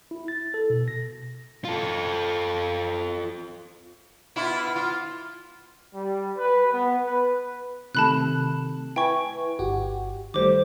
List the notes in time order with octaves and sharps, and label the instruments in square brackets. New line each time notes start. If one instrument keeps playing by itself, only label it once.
[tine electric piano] E4
A6
A4
B2
A#6
[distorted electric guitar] F4 A4
[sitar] B2 E4 F4
F4
[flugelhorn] G3
B4
B3
B4
[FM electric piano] C3 D#3 A3 [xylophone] A5 B5 F#6
[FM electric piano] E4 B4 G#5 [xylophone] G5 C#6
[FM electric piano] G1 F#4 G4
[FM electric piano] D#3 G3 A3 [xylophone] C5 D6